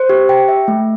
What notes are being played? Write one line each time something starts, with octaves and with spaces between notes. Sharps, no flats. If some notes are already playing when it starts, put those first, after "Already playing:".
Already playing: C5
G4
G5
E5
A3